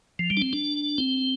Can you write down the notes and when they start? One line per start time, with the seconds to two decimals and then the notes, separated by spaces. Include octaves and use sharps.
0.19 F3
0.30 G3
0.37 D4
0.42 C4
0.53 D4
0.98 C4